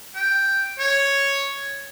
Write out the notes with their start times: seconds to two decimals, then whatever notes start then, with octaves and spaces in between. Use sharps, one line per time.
0.16 G5
0.80 C#5